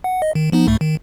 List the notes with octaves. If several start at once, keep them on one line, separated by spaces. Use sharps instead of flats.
F#5
D#5
D#3
F3 B3 D#4
C2 G#2 A3
D#3